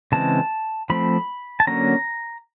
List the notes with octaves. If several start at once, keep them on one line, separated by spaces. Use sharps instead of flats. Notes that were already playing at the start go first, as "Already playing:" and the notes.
C#3 E3 G#3 C4 A5
F3 A3 C4 B5
A5
D3 F#3 A#3 C#4 A#5